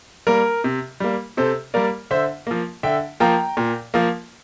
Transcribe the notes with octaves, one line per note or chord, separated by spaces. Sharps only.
G3 A#3 A#4
C3
G3 A#3
C3 A4 C5
G3 A#3 A#4 D5
D3 C5 E5
F3 A#3
D3 E5 G5
F3 A#3 G5 A#5
A#2
F3 A#3